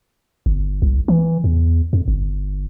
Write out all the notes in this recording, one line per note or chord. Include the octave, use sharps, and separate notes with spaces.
G1
C2
E3
E2
F2
G1